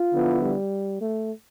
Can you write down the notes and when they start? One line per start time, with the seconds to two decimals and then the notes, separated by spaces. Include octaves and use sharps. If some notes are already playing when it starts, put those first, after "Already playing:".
Already playing: F4
0.12 D3 F3 B3 E4
0.42 G3
1.01 A3